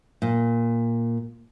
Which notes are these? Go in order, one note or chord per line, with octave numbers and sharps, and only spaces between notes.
A#2